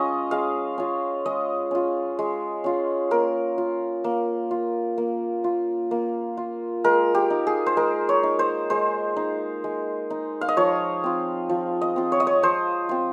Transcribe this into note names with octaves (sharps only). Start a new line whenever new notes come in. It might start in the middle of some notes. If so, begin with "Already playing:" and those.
Already playing: G#3 C#4 F4 D#5
G#3 F5
C#4 F4
G#3 D#5
C#4 F4
G#3
C#4 F4
A#3 A#4
F4
A#3
F4
A#3
F4
A#3
F4
G#3 A#4
G4
D#4
G#4
C5
G#3 A#4
C#5
D#4
C5
G#3 C5
D#4
G#3
D#4
F5
D#5
F3 C#5
C4 F4
F3
D#5
C4 F4
C#5
D#5
C#5
F3 C5
C4 F4